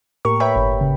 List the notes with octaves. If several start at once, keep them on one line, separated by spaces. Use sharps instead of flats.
A2 A#3 G4 A#4 C#6
A#4 B4 C#5 E5 G5 B5
G1
C#3